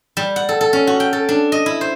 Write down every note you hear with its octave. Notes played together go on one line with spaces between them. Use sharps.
G3
F#5
A4
A4
C#4
F#4
G5
A4
D4
D#5
E4
C5